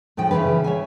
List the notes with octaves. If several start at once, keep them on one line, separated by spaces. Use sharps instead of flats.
A2 C#3 F3 G5
C#3 E3 F3 G#4 B4
C#5 E5 G#5